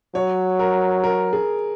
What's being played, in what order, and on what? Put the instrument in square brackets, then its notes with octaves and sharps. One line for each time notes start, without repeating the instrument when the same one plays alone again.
[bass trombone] F#3 [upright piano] C#5
[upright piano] A#4
A#4
G#4